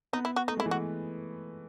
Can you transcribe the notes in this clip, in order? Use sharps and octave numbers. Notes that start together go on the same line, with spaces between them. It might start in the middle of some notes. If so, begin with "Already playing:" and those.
B3 D#4
E4
F#4
A3 D#4
G#3 E4
E3
F#4